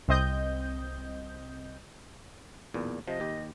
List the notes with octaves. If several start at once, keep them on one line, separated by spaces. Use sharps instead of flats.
C2 C4 D#5 G6
B1 E2 A#2
C3 F3 D#5
D#2 G4